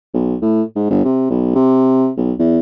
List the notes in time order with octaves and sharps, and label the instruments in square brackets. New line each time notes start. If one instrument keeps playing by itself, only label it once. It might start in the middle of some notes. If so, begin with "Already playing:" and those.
[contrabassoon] B1
A2
G#2
G1
C3
B1
C3
B1
E2